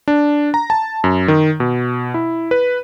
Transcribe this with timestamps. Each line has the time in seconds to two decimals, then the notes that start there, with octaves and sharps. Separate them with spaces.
0.08 D4
0.54 A#5
0.70 A5
1.04 F#2
1.28 D#3
1.60 B2
2.14 E4
2.51 B4